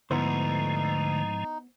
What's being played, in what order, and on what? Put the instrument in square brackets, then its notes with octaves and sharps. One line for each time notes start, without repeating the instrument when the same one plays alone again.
[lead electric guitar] D2 [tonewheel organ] G#2 F3 G#3 [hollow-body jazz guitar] B3 E4 C5 [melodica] D#4